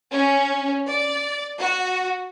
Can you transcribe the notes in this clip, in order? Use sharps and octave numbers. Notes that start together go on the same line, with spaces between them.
C#4
D5
F#4